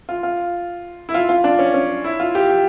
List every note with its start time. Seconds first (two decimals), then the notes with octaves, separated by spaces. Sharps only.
0.09 F4
0.23 F4
1.09 E4
1.14 F4
1.29 F4
1.44 D4
1.59 C#4
1.74 C#4
2.04 E4
2.20 F4
2.35 G4
2.50 G4